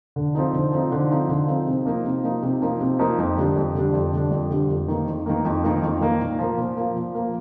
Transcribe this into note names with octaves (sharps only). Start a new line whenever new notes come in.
D3
F3 C4 D#4
D3
F3 C4 D#4
D3
F3 C4 D#4
D3
F3 C4 D#4
C3
F3 A#3 D#4
C3
F3 A#3 D#4
C3
F3 A#3 D#4
C3
F3 A#3 D#4
F2
D3 G3 D4
F2
D3 G3 D4
F2
D3 G3 D4
F2
D3 G3 D4
F2
D#3 A#3
F2
D#3 A#3
F2
D#3 A#3
F2
D#3 A#3
A#2
F3 A#3
A#2
F3 A#3
A#2
F3 A#3